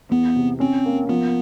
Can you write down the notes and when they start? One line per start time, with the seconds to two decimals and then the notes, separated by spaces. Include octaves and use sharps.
0.11 E2 B3
0.36 C3
0.60 C4 C#4
0.85 A#3
1.09 F3 B3